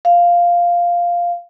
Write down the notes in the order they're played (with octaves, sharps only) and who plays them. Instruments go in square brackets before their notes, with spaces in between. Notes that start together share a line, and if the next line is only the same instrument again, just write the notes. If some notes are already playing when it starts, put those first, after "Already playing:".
[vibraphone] F5